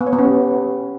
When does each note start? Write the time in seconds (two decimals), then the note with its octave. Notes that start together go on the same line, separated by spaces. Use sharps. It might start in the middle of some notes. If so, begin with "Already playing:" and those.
0.01 B3
0.07 C#5
0.13 B3
0.19 C#4
0.25 G4